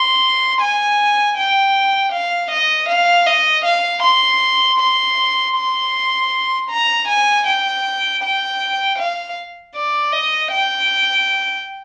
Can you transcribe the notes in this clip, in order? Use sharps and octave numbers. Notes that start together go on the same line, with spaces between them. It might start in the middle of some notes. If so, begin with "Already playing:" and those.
Already playing: C6
G#5
G5
F5
D#5
F5
D#5
F5
C6
C6
C6
A#5
G#5
G5
G5
F5
D5
D#5
G5